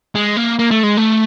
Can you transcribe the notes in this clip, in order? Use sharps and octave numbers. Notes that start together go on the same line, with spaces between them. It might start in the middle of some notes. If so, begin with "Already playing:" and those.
G#3
A#3
A#3
A3
G#3
A3